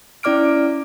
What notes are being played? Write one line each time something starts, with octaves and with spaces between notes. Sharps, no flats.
C#4 E4 D5 D6 F6 D7